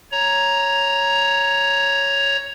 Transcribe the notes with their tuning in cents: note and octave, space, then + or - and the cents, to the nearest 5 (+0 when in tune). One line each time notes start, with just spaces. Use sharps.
C#5 +0 A#5 +5